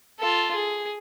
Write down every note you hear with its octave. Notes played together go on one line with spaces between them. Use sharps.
F4 A4
G#4